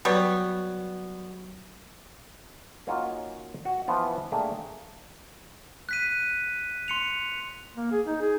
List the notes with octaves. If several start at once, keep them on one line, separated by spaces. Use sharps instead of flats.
F#3 G3 B3 C#5
A#3 C#4 D#4 F4 F#4
F#4
E3 F3 B3 F4
A3 A#3 D4 G4 G#4
F#6 B6 D#7
C6 C#7 F7
A#3
G#4
D#4
G#4